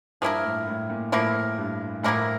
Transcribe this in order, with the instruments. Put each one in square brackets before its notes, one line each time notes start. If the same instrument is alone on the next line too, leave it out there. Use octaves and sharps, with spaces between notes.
[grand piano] G2 [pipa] F3 A#3 E4 A#4
[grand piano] A2
A2
A#2
[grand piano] A2 [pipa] F3 A#3 E4 A#4
[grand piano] G2
[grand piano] A2 [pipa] F3 A#3 E4 A#4